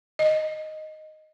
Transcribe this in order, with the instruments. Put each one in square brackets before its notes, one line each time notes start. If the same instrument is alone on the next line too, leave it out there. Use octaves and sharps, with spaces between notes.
[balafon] D#5